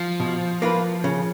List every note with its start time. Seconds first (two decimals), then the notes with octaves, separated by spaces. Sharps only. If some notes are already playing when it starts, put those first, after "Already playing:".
Already playing: F3
0.20 B2
0.62 A#3 F4 B4
1.04 C#3